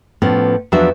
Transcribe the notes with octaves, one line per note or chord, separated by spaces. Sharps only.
A2 F3 B3 C#4
E2 F3 F#3 D4 F#4 E5